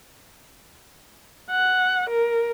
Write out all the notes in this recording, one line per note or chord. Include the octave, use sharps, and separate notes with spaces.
F#5
A#4